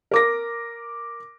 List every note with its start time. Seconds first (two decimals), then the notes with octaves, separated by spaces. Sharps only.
0.11 A#4 D6 A#6